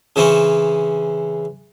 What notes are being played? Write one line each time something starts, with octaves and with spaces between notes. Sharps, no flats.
C#3 E3 C4 C#4